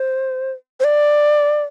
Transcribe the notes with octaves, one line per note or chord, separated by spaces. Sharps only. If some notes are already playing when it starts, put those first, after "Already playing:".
Already playing: C5
C5
D5